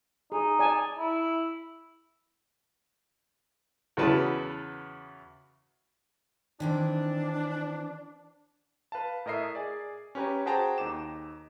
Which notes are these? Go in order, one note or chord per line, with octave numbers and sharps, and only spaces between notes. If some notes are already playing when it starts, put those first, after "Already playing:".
D#4 G#4
D5 G#5 A5
E4
E2 C#3 E3 F#4 B4 A5
D#3 E3 C4 D4
B4 F5 A5
A2 A#4 D#5 E5 C7
G#4 D5
C#4 G4 B4 C#5 A#5
F#4 G#4 C5 G5 A5 A#5
D#2 D#4 D6 E7